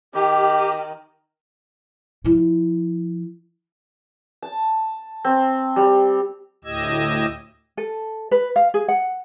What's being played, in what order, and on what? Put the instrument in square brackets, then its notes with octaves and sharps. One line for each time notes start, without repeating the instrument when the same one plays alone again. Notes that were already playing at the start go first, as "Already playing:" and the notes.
[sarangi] D#3 [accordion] G4
[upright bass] F3 E4
[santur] A5
C4
G3
[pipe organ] D2 A2 G4 D#5 E6 G#6
[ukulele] A4
B4
F5
G#4
F#5